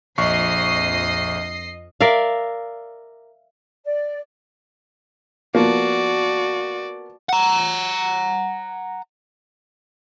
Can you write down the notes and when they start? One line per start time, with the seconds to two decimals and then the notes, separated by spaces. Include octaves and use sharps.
0.18 A#1 F2 D#5 C#6 C7
2.01 A#4 D5 E5 F5
3.85 D5
5.55 F3 A#3 B3 F#4 D5
7.29 F#5 A#5